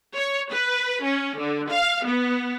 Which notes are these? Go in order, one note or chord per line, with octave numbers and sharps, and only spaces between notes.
C#5
B4
C#4
D3
F5
B3